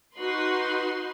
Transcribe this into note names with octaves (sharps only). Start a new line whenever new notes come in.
D#4 F#4 B4 C6